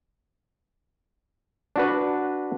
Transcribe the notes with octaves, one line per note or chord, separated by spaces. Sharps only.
D4 F#4 B4